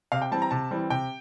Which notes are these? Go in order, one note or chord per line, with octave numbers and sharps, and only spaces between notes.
C3 F5
G5
E3 G3 C4 A5
A#5
C3 A5
E3 G3 C4
C3 G5